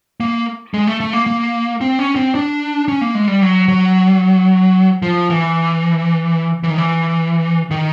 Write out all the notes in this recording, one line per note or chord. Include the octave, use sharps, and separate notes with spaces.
A#3
G#3
A3
A3
A#3
A#3
C4
C#4
C4
D4
C#4
A#3
G#3
G3
F#3
F#3
F3
E3
E3
D#3
E3
D#3